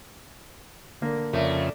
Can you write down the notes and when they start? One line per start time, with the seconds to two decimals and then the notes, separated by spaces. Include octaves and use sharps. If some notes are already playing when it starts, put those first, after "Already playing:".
1.02 D3 A#3
1.33 F2 C#3 A3 A#4 D5